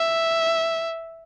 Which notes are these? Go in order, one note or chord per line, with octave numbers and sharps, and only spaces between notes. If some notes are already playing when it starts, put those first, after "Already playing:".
Already playing: E5